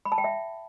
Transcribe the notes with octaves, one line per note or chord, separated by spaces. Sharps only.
B5
A5
G5
E5